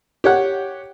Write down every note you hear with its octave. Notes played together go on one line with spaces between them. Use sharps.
G4 C#5 F#5